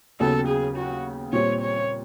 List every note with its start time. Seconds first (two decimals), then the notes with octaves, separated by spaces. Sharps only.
0.20 D#2 C#3 F#3 B3 A4
0.47 G#4
0.77 F#4
1.32 A#2 G3 C4 C#5
1.61 C#5